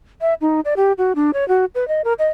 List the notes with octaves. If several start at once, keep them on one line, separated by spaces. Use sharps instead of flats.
E5
D#4
D5
G4
F#4
D4
C#5
F#4
B4
D#5
A#4
D#5